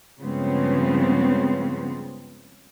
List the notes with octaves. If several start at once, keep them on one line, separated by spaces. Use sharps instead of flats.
G2 C#3 F3 G#3 B3 C4